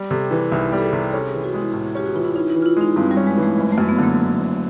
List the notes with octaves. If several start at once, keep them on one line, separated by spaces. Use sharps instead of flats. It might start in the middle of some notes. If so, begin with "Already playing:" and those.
Already playing: G3
C3 A4
A4
E3 G#4
C2 D#4
G3
A4
G#4
C3
C#4 A4
G#4
E3
F#4
G#3 E4
A2
C#4 G4
F#4
E3 F4
E4
C#4 D#4
E4
E3
F4
E4
G#3 D#4
G2 C4
G3
C#4
G#3
E3 A3
F#1 G#3
A3
F#2
B3
D3 A#3
F#1
F#1